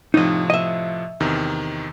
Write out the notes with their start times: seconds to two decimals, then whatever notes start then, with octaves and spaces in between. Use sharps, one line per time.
0.14 A2 C3 F3 D#4 D#5
0.50 D#5 E5
1.20 E2 C3 D#3